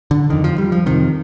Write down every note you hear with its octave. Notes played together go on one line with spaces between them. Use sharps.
D3
F2 D3 D#3
F3
G3
F3
F2 C3 D#3